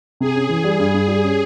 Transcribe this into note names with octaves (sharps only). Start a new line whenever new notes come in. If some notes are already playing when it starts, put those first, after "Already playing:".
C3 G#4
C#4
E3
G3
G2
G2
G3
C#4